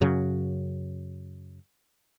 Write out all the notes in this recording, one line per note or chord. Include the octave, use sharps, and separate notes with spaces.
F#2 C#3 F#3